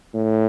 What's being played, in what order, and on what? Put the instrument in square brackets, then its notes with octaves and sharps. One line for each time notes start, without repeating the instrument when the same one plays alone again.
[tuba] A2